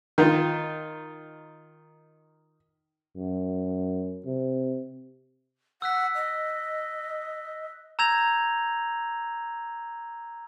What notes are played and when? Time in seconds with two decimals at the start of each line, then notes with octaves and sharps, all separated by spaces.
0.18 D#3 F4
3.16 F#2
4.25 C3
5.82 F#5 E6 F#6 B6
6.15 D#5
7.99 A#5 E6 G6 G#6 A#6 F7